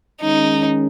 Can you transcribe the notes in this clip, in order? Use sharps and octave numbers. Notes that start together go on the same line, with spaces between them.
D#3 G#3 C#4 D#4